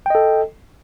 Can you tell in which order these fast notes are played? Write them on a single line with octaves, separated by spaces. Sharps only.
G5 D#5 A4